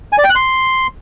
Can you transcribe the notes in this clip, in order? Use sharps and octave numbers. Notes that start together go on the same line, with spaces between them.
G#5
D5
G5
F#6
C6